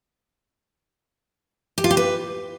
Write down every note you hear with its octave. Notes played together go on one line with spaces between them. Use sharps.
G4
F4
G4
B4